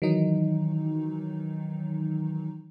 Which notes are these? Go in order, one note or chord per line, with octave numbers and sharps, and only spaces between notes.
D#3 E3 F#3 D#4